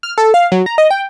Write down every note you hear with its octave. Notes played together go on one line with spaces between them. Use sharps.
F6
A4
F5
F#3
A#5
D#5
G5